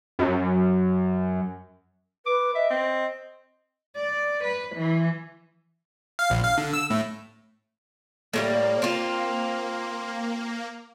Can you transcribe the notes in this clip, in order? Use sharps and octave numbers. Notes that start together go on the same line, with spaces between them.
F#2
B4 D6
D#5 E5
C4
D5
B4
E3
F5
A#1
F5
D3
E6
A2
A2 F#3 G3 A#3
C4 F4